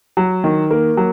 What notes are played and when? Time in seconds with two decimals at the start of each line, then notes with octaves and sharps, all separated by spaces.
0.17 F#3
0.44 D#3
0.71 A#3
0.97 F#3